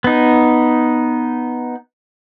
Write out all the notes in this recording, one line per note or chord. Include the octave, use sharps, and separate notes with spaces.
B3 D#4